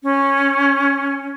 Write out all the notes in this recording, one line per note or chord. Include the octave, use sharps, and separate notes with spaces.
C#4